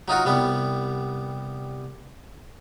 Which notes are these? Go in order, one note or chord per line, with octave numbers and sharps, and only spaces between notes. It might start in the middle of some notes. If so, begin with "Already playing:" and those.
F#3 D#4 F4 F#4
C2 G3 B3